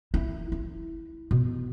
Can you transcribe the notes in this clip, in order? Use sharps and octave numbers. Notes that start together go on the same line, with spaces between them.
E4
E4
B2